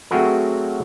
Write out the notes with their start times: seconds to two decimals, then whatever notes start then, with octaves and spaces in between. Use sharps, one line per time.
0.11 F#3 A3 C4 F#4 G#4 A#4